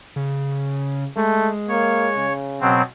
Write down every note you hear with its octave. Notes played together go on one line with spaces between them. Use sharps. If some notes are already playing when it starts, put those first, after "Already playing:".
C#3
G#3 A3
A#3 C#5
C#3
B2 F#3 C4